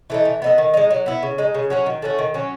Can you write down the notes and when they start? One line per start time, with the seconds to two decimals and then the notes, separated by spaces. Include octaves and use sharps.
0.10 E3 A3 D#4
0.25 E3
0.42 B3 D#4 A4
0.58 D#3
0.74 G#3 D#4
0.91 F#3
1.06 B3 E4
1.23 C#3
1.38 G#3 D#4
1.54 C#3
1.70 F#3 C#4 F#4
1.86 D#3
2.02 A3 C#4 F#4
2.18 D#3
2.34 F#3 C#4